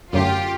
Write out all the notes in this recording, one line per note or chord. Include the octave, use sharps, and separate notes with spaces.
F#2 D3 F#3 A3 F4 G4